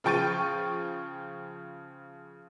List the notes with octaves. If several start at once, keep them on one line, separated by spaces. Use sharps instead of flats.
C#3 F3 G5 C#6 A6 D#7